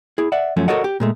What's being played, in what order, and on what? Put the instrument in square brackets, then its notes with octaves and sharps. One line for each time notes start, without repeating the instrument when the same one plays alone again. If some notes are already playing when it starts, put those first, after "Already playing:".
[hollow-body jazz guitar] E4 G#4
D5 E5 F#5
F#2 F3 F#3 A3 C#4
F#4 A4 A#4 C#5 D#5 F#5
G4
A#2 G#3 A3